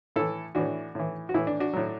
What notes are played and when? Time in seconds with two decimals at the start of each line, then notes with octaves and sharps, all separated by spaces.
0.16 A2 E3 E4 A4
0.55 A2 E3 D4 F#4
0.95 A2 E3
1.29 F#4
1.34 A2 E3 E4
1.47 D4
1.60 D4 F#4
1.73 A2 F#3